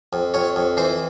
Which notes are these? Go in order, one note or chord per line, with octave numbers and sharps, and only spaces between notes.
F2
F2 C#5
F2
E3 C5